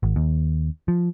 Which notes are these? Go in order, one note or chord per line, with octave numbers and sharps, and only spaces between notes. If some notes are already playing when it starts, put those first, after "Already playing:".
G#1
D#2
F3